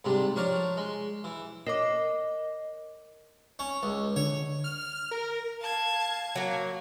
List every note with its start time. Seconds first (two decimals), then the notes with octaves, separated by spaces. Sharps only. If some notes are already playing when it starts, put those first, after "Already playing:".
0.05 G#2 C3 G3 D4
0.36 F3 D4 A#4 C#5 D5 D6
0.77 G#3
1.24 E3
1.67 A#4 C#5 D#5 D6
3.59 C#4
3.83 C#2
4.16 D3 C#5
4.64 F6
5.11 A#4
5.61 F5 A5 G#6
6.36 F#3 A#3